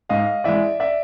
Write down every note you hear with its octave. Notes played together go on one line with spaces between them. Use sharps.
G#2 D#5 F5
E3 G#3 D5 E5
D5 E5